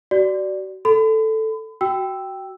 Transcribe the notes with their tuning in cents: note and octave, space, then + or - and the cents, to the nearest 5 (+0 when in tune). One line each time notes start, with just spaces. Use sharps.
F#4 +35 D5 +0
A4 +0 B5 +40
F#4 +15 G5 +0 E6 +0